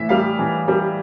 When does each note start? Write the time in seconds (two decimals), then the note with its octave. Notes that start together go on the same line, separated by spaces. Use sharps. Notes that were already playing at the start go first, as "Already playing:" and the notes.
Already playing: A2 E3 E5
0.09 G3 F5
0.39 E3
0.68 G3